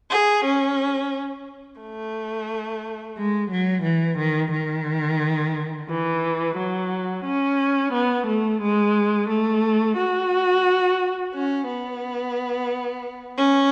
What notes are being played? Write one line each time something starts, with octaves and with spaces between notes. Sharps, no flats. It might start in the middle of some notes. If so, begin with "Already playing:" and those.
G#4
C#4
A3
G#3
F#3
E3
D#3
D#3
E3
F#3
C#4
B3
A3
G#3
A3
F#4
C#4
B3
C#4